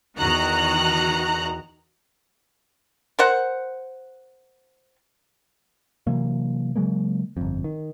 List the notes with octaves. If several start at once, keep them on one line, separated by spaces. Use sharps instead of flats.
E2 D#3 F#4 A#5 F#6
A#4 C5 F#5
C3 E3 F#3 A#3
C#3 F#3 G#3 A#3
G1 F2
D#3